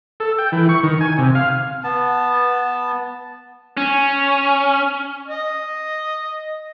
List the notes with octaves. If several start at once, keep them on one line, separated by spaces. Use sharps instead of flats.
A4
G5
E3
C#6
D#3
G#5
C3
F5
B3 A5
C#4
D#5